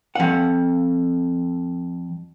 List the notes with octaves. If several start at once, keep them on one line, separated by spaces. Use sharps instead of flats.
F2 F#5